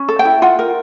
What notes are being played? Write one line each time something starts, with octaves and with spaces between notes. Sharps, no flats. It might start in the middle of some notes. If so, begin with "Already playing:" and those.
Already playing: C#4
A4
G5
E4
F4 F#5
A#4